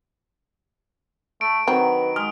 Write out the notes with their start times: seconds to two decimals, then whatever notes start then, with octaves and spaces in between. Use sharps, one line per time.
1.41 A3 D7
1.68 D#3 F#3 C4 B4
2.16 G#3 D#6 F6